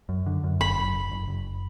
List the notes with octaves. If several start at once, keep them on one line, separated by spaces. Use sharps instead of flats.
F#2
D3
F#2
F#1 B5
F#1
F#1
F#1
F#1